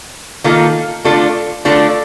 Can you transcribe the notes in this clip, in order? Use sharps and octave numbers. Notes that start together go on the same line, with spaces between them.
D#3 A#3 F4 A4
D3 A3 D4 F4 A4
D3 A3 D4 F4 A4